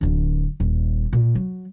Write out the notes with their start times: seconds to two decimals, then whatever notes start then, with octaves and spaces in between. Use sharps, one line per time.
0.01 D1 D3
0.60 D#1
1.13 A#2
1.35 F#3